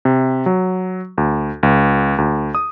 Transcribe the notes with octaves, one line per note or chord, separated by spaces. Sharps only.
C3
F#3
D2
C#2
D2
D#6